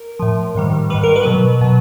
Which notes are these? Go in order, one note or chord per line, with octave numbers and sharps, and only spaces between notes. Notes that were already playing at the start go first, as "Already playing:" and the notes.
Already playing: A#4
A2 F3
G#2 D#3 G3
G#2 D#3 G3 B4
A#4
B4
B2 F#3
B2 F#3